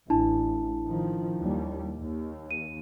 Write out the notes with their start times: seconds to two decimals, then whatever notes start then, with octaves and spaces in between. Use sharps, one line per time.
0.10 A1 D4 E4 A5
0.85 D#3 F3
1.39 D#2 G3
1.97 D#2
2.51 D#7